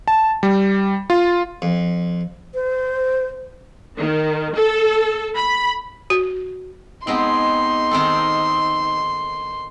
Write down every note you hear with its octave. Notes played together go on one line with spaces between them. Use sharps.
A5
G3
F4
F2
C5
D#3
A4
B5
F#4
G#3 B3 C4 D#4 C6
D#3 C4 A4